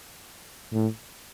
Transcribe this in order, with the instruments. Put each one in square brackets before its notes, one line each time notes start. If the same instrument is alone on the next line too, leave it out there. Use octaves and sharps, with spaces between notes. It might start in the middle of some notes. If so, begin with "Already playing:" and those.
[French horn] A2